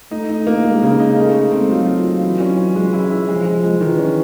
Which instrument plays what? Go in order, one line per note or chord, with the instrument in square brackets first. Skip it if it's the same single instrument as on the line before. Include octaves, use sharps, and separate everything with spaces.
[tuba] A3 [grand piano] D#4
[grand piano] D#4
A#3
[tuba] G#3 [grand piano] A#3
[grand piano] C#3
D#4
A3
A3
C4
[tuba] F#3 [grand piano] F4
[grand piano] F4
F4
E3
C#4
C#4
G#3
E4
E4
[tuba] F3 [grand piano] G#3
[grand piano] G#3
G#3
[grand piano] D#3 [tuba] E3
[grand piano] C#4